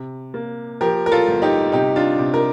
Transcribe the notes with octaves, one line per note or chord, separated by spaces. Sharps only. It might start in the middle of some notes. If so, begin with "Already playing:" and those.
Already playing: C3
A#3
F3 G4 A#4
A#4
F4 A4
G1
D#4 G4
C3 D#4 G4
D4 F4
C3
A#4